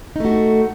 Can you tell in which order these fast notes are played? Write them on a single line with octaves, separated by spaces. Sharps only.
D#4 A3 F#4